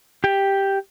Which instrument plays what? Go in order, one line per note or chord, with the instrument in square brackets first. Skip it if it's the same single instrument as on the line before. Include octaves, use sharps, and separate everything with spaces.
[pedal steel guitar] G4 G5